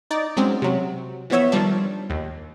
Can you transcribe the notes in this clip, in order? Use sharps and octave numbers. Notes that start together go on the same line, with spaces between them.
D#4 D5
F#3 G#3 C4 C#4
C3 F#3
E3 F3 B3 C#5 E5
D#3 F3 G3 D4
D#2